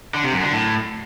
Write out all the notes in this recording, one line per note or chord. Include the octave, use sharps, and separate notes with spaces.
D3
C3
F#2
D3
A2